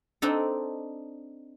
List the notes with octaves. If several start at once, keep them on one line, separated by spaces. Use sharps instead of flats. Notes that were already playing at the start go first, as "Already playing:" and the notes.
C4 D4 D#4 A4